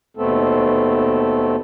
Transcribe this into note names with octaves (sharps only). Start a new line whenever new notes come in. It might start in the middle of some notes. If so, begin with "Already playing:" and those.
D#2 B2 A3 B3 C4 A4